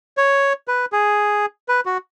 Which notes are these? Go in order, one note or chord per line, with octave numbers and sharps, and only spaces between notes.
C#5
B4
G#4
B4
F#4